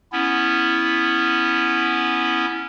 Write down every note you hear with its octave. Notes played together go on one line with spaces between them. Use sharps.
B3 C#4 E4